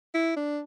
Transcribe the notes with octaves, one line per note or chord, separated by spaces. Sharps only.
E4
D4